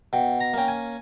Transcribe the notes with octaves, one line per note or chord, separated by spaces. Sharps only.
B2 G5
A#5
A#3 C#4 G5
G#5